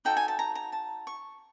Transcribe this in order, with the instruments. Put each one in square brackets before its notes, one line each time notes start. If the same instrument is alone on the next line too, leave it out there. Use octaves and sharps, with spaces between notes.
[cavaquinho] D#4 F#4 A4 G5
G#5
A5
A#5
A#5
A5
C#6